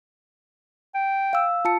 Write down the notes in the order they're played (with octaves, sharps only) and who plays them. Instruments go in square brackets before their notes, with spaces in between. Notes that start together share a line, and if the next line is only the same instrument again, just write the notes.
[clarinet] G5
[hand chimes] F5 E6
F4 A5 C#7